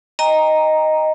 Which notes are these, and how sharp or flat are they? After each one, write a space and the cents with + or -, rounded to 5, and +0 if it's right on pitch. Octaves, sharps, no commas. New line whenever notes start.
D#5 +0 G5 +40 A#5 +0